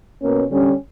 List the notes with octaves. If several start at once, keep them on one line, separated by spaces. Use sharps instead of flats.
B2 A#3 C#4
D3 G3 C#4